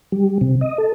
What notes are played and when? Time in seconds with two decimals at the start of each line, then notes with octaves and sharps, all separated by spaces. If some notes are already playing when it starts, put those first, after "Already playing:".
0.12 G3
0.41 C3
0.61 D#5
0.78 A4